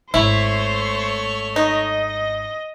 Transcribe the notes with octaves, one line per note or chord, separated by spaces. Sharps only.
G#1 A3 E4 C5 C#5
D#4 D#5